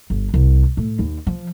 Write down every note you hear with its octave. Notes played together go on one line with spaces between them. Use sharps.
G1
C2
A2
D#2
F3